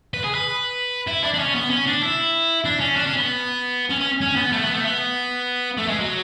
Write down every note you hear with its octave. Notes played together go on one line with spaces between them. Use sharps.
B4
G#4
B4
E4
D4
D4
C#4
B3
C#4
D4
E4
D4
C#4
D4
C#4
B3
C#4
C#4
C#4
B3
A3
B3
A3
B3
A3
G#3
F#3